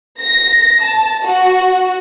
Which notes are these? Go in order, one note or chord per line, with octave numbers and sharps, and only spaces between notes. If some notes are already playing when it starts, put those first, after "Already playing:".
A#6
A5
F#4